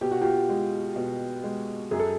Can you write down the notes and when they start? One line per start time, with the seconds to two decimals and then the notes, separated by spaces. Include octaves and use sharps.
0.01 B2 G4
0.11 F#4
0.21 F4 G4
0.49 G#3
0.96 B2
1.44 G#3
1.91 F#2 G#4
2.00 A4